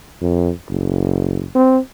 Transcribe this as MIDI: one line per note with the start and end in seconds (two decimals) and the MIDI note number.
0.21 0.51 41
0.70 1.46 30
1.55 1.78 60